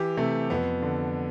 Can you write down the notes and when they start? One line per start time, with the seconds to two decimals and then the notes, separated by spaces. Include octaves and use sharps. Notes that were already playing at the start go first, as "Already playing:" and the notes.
Already playing: E3 G4
0.17 C3 A3
0.50 F2 B3
0.82 D3